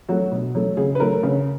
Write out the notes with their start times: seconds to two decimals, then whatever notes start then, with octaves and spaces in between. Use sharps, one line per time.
0.09 F#3 A3 F#4
0.32 B2
0.55 F#3 A3
0.77 C#3 G#4
0.95 B4
1.00 F#3 A3 A#4
1.23 C#3